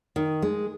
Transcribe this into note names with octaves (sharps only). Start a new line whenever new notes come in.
D#3
G#3